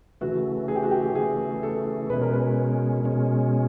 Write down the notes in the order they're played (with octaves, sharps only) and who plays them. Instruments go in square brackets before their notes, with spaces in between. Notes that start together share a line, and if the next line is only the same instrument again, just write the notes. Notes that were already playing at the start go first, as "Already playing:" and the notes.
[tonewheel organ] C#3 E3 A3 [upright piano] F#4
[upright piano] G#4
G4
F#4
G4
[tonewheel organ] C#3 E3 A3 [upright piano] G#4
[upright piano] A4
[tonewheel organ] B2 G#3 C#4 [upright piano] B4
[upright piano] A#4
B4
[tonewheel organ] B2 G#3 C#4